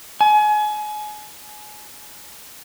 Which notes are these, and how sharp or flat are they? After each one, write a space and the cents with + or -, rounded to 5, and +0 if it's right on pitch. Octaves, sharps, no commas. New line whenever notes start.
G#5 +30